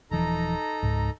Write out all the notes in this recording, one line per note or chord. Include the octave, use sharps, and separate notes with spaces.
D#1 E3 F3 D#4 A4 A#5
C#2 G#2